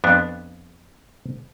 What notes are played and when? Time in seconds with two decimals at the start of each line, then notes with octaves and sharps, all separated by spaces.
0.04 F2 B3 D4 F#6